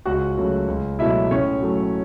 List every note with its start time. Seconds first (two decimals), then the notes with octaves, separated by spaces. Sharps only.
0.05 C#2 F#4 F#5
0.37 C#3 F#3 A3
0.68 C#2
0.99 B2 F#3 A3 E4 E5
1.31 A2 C#4 C#5
1.62 F#3 A3